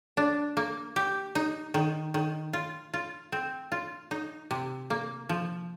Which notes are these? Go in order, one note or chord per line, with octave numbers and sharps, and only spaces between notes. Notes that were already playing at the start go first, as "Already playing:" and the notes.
D4
A#3
G4
D#4
D#3
D#3
F4
F4
C4
F4
D#4
C3
A#3
F3